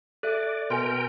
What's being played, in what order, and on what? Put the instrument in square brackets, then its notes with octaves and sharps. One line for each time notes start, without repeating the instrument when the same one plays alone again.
[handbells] A4 E5 [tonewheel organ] D5 [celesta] F#6
[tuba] B2 [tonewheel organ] A#4 G5 [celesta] G#5 C6